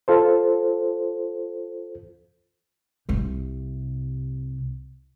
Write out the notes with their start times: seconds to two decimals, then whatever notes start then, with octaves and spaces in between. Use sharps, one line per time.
0.08 F4 A4 C5
3.09 C2 C3